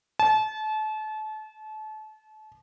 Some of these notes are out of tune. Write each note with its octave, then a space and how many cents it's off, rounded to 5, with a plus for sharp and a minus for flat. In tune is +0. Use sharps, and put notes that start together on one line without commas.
A5 -30